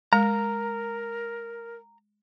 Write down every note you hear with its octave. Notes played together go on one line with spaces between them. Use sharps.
G#3 A#4 A#5